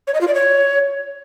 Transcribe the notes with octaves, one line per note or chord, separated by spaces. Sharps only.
C#5
D#5
F4
D5
C#5